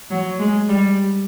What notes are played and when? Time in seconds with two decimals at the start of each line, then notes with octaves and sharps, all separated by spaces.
0.11 F#3
0.39 G#3
0.69 G3